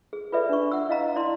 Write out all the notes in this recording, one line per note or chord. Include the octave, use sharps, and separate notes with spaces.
G#4
F4 A4 B4 D5 E5
D4 C#6
F#5 E6
E4 D#5 F5 A#5
E4 D5 A5 C6